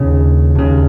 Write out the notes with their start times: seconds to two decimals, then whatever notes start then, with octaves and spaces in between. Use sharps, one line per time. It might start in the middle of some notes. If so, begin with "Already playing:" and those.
Already playing: D#2 C#3
0.55 D#2 C#3